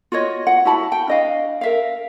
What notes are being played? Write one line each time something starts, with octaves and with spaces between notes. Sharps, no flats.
F4 F#4 C#5 D#5
F#5
E4 F#4 A5 B5
G5
D4 D#5 F5
A#4 E5 F5